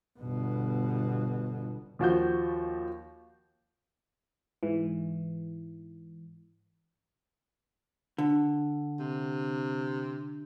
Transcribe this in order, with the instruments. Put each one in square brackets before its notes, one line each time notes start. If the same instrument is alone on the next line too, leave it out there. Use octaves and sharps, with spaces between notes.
[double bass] G1 B2
[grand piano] D#2 F3 F#4 G6
[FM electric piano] G#2 E3
[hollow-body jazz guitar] D3
[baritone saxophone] C3